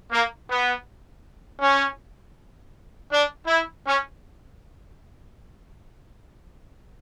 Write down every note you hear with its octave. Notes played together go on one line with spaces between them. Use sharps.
A#3
B3
C#4
D4
E4
C#4